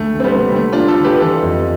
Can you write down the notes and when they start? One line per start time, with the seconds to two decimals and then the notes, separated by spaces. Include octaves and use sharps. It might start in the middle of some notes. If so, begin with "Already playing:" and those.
Already playing: D2 A3
0.14 D2
0.20 C4
0.24 G3 B3
0.35 C3
0.52 G3
0.56 D3 A3
0.72 D4 F4
0.78 D2
0.88 F4 A4
0.99 D3
1.04 G4 B4
1.15 B4
1.21 E3 F4 A4
1.42 F2